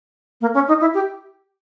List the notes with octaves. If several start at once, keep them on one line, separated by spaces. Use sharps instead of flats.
A#3
C#4
D#4
E4
G4